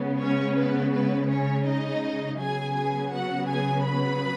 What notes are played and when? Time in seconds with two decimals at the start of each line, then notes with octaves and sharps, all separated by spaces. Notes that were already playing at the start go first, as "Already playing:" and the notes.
Already playing: C#3 G#3 B3
0.20 C#4 C#5
0.56 B3 B4
0.93 B3 B4
1.29 C#4 C#5
1.66 D#4 D#5
2.39 C#3 F#3 B3 G#4 G#5
2.75 G#4 G#5
3.12 F#4 F#5
3.49 G#4 G#5
3.85 B4 B5